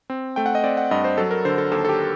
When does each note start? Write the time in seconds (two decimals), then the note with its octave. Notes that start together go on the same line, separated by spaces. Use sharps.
0.10 C4
0.36 A3 G5
0.46 F#5
0.55 D#5
0.64 C4 D5
0.77 F#5
0.91 G2 D#5
1.04 C5
1.18 F#3 A4
1.31 A#4
1.45 D3 C5
1.58 A4
1.72 D#2 A4
1.85 A4
1.89 G4